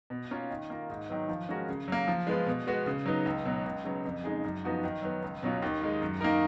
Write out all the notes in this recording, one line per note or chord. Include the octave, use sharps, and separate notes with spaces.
B2
A#3 C#4 F4
D#3
A#3 F4 A#4
G#2
D#3 F#3 B3
F3
G#3 C#4 F#4 A#4
C#3
F#3 A#3
F3
G#3 B3 F4 B4
B2
G#3 B3 F#4
C#3
F#3 B3 D#4
C#2
B2 F#3
C#2
C#3 F#3 B3
F2
C#3 G#3 D#4 G#4
F#2
F3 B3 D#4 F#4
D#3
F#3 B3
C#2
B2 F#3 C#4 F4
D#2
D#3 G#3 D#4
F#2
D#3 A#3 D#4 A#4